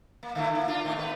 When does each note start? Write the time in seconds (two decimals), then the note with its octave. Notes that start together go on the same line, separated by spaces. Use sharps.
0.23 A#3
0.35 D3 A3 E4
0.55 A#3
0.68 D4 F4
0.84 A#2 D#3 A3
0.96 B3 B4